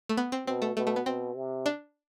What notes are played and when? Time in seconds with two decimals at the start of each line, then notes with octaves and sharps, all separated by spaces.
0.09 A3
0.17 B3
0.32 C4
0.47 B2 C4
0.62 A3
0.77 B2 A3
0.87 A3
0.96 B3
1.06 B2 C4
1.36 C3
1.66 D4